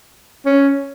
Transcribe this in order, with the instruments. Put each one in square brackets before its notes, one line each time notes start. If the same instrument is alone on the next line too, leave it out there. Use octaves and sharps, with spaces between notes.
[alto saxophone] C#4